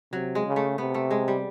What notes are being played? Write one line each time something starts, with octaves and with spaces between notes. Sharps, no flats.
C3 F#3
G#3
C#3
A3
C3 B3
A3
G#3
G3